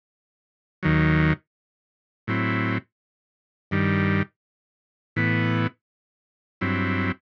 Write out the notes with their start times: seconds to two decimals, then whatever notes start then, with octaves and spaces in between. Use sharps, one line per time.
0.83 D#2 D#3 F#3
2.27 A2 F#3 C4 E4
3.71 G2 D#3 G3
5.16 A2 E3 B3
6.61 G2 F#3 C4 E4